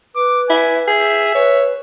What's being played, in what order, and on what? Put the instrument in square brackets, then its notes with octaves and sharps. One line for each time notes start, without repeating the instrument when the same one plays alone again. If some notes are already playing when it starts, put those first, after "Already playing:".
[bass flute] B4 [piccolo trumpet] D6
[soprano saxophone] E4 [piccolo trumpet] G#5
[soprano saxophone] G#4 [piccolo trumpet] E5
[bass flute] B4 [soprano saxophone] C#5